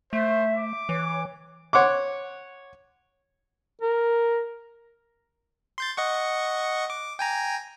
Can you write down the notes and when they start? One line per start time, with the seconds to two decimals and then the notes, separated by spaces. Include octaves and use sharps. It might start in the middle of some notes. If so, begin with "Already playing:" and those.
0.13 A3 C5 E5
0.57 D6
0.89 E3 C#5
1.73 C#5 F#5 C6 D6
3.82 A#4
5.78 C6 G6 A6
5.97 D#5 F#5 C#6
6.90 D6
7.19 G5 G#5 A#5